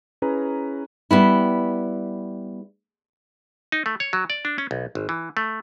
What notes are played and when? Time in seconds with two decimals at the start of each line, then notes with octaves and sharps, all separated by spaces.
0.22 C#4 E4 G#4 B4 A#5
1.11 G3 B3 E4
3.72 D#4
3.86 A3
4.00 C#5
4.13 F#3
4.30 D5
4.45 D4
4.58 C#4
4.71 B1
4.95 G#1
5.09 E3
5.37 A3